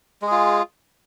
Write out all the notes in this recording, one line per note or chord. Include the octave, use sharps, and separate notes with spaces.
G#3 F4 G#4